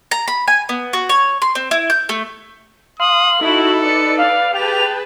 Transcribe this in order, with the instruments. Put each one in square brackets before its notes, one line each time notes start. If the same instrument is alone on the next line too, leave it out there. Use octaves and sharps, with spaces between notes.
[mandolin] A#5
B5
G#5
B3
F#4
C#5
C6
C4
E4
G6
A3
[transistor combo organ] F5 C6 [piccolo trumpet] D#6 [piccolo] F#7
[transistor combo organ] D#4 [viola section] E4 F#4 [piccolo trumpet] A4
[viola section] B4 D5 [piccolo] C#7
[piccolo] F5
[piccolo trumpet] G4 [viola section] G#4 B4 A5 [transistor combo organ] G5 [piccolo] F7